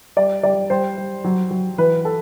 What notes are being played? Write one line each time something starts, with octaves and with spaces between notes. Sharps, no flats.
G3 D5
G3 D5
G3 C5
G3
F#3
F#3
E3 B4
A4